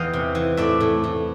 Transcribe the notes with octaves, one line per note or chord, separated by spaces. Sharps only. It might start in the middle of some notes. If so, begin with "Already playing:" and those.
Already playing: E2 E3 D#5 F5 G5
C3
E3
A2 D5 E5
A2
A2